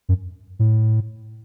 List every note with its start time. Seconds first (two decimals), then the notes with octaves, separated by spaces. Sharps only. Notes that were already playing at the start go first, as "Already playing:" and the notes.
0.09 F#2
0.59 A2